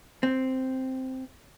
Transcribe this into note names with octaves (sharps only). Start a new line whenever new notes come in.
C4